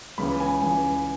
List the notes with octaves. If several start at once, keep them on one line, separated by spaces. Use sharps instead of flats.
C#2 C#3 E3 B5
G#5
C#2 C#3 E3 G#5